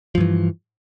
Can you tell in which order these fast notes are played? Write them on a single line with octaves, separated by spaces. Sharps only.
F3 G2 E3